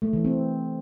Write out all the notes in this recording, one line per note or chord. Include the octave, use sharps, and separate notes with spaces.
A3
E3
C4